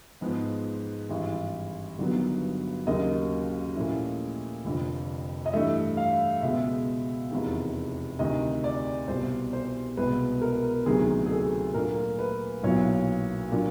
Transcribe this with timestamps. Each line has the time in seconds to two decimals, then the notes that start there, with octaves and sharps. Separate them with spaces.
0.21 G#2 F3 G#3 B3
1.09 G#1 G2 E3
1.99 G1 G2 D#3 F#3 B3
2.87 D#2 C#3 F#3 A#3 D#5
3.75 A#2 F3 A3 C#4 E4
4.65 F1 F2 D3
5.46 D#5
5.53 G2 E3 A3 E5
5.97 F5
6.42 C#2 B2 G#3 B3 E5
7.31 F1 E2 C3 D#3
8.19 D2 C3 D#3 D#5
8.64 D5
9.08 C2 B2 G3 B3 C5
9.53 C5
9.97 C2 B2 G#3 B4
10.42 A#4
10.86 D2 C3 D#3 F#3 B3 G#4
11.26 G#4
11.31 A4
11.74 A#2 F#3 A3 D4 A#4
12.19 B4
12.63 B1 A#2 F#3 B3 E4 C#5
13.52 A#2 F#3 A#3 D4 F4